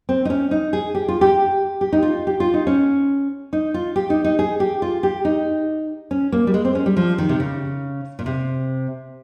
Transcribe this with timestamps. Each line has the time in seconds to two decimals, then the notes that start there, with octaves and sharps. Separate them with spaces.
0.09 C4
0.25 D#4
0.30 C#4
0.51 D#4
0.73 G#4
0.95 G4
1.08 F4
1.21 G4
1.81 G4
1.93 D#4
2.02 F4
2.27 G4
2.40 F4
2.54 D#4
2.67 C#4
3.53 D#4
3.74 F4
3.96 G4
4.10 D#4
4.24 D#4
4.39 G#4
4.60 G4
4.82 F4
5.03 G4
5.25 D#4
6.11 C#4
6.32 A#3
6.47 G3
6.54 G#3
6.65 C4
6.75 C#4
6.86 G3
6.97 F3
7.18 D#3
7.29 C3
7.40 C#3
8.19 A#2
8.26 C3